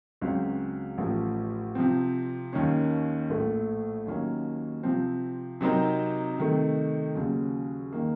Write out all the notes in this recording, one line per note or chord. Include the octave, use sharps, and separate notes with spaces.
C#2 C#3 F#3 C4 F#4
A1 A2 F3
C3 F3 C4
D#2 D#3 A#3 C#4
A#1 A2 A3
D#2 D#3 F#3 A#3 C#4
C3 F3 C4
C3 F#3 C4 D#4 A#4
C3 D#3 A3
D#2 C#3 F#3
D#3 A#3